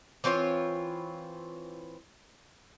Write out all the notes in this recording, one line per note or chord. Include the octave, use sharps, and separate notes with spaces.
E3 C4 F4 C#5